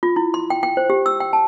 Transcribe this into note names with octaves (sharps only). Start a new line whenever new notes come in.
F4
E4
C6
G5
G5
C5
G4
E6
G5
A5